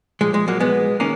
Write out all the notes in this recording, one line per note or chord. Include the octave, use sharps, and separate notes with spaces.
A#2 F3 G#3
G#3
F#3 A#3
G#3 B3
D#3 A#3 C#4